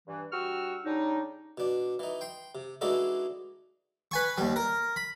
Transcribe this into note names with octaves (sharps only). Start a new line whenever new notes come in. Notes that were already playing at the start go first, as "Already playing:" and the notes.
G2 E3
G2 F#4 G5 C#6 E6 F6
C#3 G3 D4 D#4
B2 D4
E3 D#4
G5 C6
C3
E3 G#3 D4 D#4 F#4 A4
B4 G#5 C#6
D#2 G3
A#4
B5